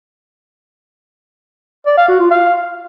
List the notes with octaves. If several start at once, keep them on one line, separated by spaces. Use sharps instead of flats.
D5
F5
F#4
F4
F5